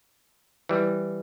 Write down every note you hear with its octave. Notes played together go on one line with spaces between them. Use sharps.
E3 G3